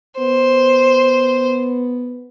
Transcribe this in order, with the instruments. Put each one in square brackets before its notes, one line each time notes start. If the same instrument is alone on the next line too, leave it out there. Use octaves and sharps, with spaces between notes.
[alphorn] B3 [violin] C5